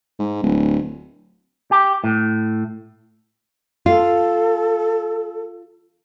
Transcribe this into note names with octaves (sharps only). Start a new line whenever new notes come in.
G#2
D1
G4
A2
F4 A4